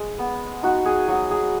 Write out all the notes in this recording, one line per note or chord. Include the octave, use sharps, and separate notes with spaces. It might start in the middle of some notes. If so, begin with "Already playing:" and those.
Already playing: G#3
B3
D#4 F#4
G#4
F#3 F#4
G#4